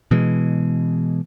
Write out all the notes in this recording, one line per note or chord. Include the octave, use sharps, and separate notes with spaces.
B2 E3 G#3